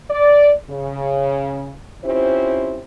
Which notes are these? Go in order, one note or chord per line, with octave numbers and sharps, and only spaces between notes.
D5
C#3
C4 C#4 E4 F4 G4 C5